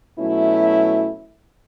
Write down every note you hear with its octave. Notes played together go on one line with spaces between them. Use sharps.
B2 F#3 A3 C#4 E4